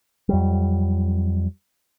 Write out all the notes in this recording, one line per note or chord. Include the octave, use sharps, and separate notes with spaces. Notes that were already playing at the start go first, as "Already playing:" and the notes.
F2 F#3 G3